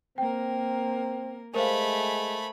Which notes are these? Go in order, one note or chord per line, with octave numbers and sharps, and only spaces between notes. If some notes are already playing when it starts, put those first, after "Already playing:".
A#3 C4 A#4 G5
G#3 A3 A#4 C5 F5 G#5 B5